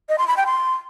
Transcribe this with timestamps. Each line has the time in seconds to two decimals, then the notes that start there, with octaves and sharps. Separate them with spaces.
0.09 D#5
0.18 C6
0.28 B5
0.37 G5
0.46 C6